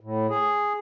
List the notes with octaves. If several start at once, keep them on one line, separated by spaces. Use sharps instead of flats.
A2
G#4